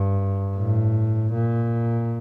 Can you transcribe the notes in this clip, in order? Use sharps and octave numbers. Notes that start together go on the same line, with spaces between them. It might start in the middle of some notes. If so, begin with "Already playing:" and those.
Already playing: G2
A2
A#2